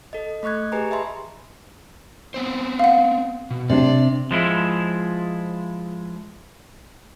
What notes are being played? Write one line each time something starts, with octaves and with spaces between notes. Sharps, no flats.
A4 D#5
A3 D#5 C#6 F#6 G#6
G4 G#4 B4 G#5 A#5
D#5 E5 A5 B5 C6
B3 C4 C5
F5 F#5
B2
C3 D4 D5
F3 G#3 E4